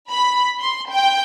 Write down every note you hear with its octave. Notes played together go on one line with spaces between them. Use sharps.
B5
C6
G5